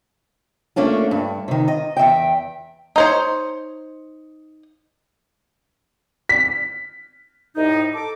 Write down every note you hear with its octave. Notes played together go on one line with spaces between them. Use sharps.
A3 A#3 C#4 D4 F4
G2
C3 D#3
D#5
E2 F#3 E5 G5
D#4 C5 C#5
B6
C2 A2 D#4
A4 D6